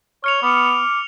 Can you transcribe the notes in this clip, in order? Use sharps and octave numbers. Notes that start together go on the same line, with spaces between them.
C#5 F6 C#7 F7
B3 D6